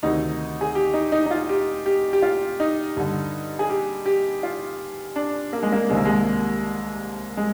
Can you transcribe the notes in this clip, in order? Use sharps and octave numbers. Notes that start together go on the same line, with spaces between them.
D2 C3 D#3 D#4
G#4
G4
D#4
D#4
D#4
F4
G4
G4
G4
F4
D#4
G2 D3
G#4
G4
G4
F4
D4
A#3
G#3
A#3
C2 C3 D#3 G#3
A#3
G#3
G#3